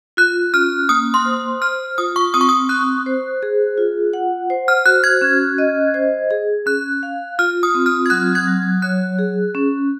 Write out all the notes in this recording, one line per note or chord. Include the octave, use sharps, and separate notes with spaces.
F4 F#6
C#4 F6
A#3 D#6
C6
C5
C5 F6
F4 D#6
C#6
C4 D#6
C#6
D#6
C4 F#6
C5
G#4
F4
F#5
C5
F6
F#4 F#6
G#6
C#4
D#5
C5
G#4
C#4 F#6
F5
F4 F6
D#6
C4
F6
G#6
F#3 F#6
G#6
F#3
C#5 F#6
G#4
C#4